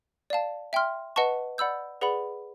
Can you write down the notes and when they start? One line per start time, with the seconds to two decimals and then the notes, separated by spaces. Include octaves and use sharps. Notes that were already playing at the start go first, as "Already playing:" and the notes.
0.30 D5 F5 A5
0.73 E5 G5 C6 F6
1.16 B4 D#5 F#5 A5 C#6
1.58 D5 F#5 B5 E6 G6
2.01 G#4 B4 D5 F#5 B5